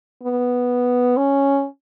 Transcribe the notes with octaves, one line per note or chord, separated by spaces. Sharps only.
B3
C#4